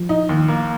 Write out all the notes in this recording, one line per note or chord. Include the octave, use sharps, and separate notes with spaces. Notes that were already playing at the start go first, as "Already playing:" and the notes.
Already playing: F3
D#4
D#2
A#3